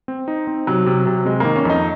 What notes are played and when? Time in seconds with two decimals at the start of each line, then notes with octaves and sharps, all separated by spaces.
0.08 C4
0.28 D#4
0.47 C4
0.67 C3 F#3
0.87 C3
1.07 C3
1.25 C3 G#3
1.40 D#3 A#3
1.56 C#4
1.65 F2 D#4